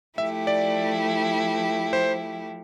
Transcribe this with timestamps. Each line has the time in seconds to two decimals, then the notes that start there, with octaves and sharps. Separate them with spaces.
0.18 F3 A3 E4 G4 E5
0.47 D5
1.93 C5